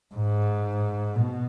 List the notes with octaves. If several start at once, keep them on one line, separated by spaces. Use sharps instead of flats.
G#2
B2